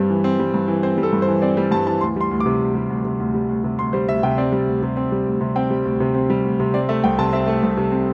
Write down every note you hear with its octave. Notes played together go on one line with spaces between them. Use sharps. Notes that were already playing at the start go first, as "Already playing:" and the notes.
Already playing: G2 G3 C4
E3
C4
G3
G2
E3
C4 C5
G3
A4
G2
C5
E3
C4 D5
G3
G2 A5
E3 A5
D2 C6
G3 C6
D2
D6
C3
D2
G3
D2
C3
D2
G3
D2
C3
D2 C6
G3 C5
D2 E5
C3 G5
C4 D5
G3
D2
C3
C4
G3
D2
C3
C4 G5
G3
D2
C3
C4
G3
D2
C3
C4 D5
A3 E5
C2 G5
C3 A5
C4 E5
A3
C2
C3
C4